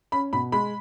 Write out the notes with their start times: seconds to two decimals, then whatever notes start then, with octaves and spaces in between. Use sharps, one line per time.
0.12 C#4 B5
0.33 B2 B5
0.52 G#3 B5